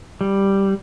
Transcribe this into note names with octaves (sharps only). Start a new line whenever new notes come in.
G3